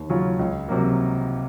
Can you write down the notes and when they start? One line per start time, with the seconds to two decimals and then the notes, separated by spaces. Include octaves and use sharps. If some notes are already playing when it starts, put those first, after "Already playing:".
Already playing: D#2
0.10 C#3 F#3 C#4 F4
0.39 C#2
0.68 C3 F#3 A#3